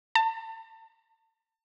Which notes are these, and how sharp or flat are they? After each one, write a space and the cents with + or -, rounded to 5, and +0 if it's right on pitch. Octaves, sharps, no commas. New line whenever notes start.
A5 +35